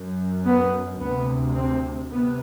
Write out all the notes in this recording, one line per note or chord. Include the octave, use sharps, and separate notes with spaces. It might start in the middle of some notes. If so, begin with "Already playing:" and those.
Already playing: F#2
B3
D2 C3 B3
C4
C3 B3